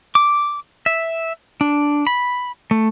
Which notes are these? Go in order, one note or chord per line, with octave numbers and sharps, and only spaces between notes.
D6
E5
D4
B5
A3